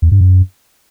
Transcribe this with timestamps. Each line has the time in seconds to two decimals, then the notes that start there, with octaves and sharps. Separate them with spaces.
0.02 E2
0.12 G2
0.21 F#2